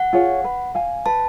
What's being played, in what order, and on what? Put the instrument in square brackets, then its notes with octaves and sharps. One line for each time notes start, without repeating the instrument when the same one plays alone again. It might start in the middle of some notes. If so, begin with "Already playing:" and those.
Already playing: [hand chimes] F#5
[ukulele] F4 G#4 C#5
B4
F5 G#5
[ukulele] B4 [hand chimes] A5